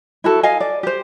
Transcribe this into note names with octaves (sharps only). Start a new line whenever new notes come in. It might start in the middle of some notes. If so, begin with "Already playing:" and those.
E4 F#4 A4
D#5 F5 G#5
D5
G4 C5